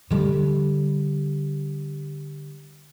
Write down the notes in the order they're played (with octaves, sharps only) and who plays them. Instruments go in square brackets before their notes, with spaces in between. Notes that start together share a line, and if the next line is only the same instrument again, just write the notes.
[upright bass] D3 G3